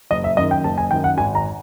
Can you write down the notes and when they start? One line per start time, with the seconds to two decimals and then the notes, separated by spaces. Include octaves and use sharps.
0.11 F#1 D#5
0.24 E5
0.37 F#2 D#5
0.41 D#3
0.51 G5
0.64 F#1 A5
0.78 G#5
0.91 F#2 D#3 G5
1.04 F#5
1.17 G#1 G#5
1.35 A#5